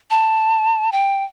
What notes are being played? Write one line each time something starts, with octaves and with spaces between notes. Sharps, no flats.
A5
G5